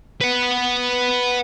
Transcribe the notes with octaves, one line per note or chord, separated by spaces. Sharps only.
B4 F#5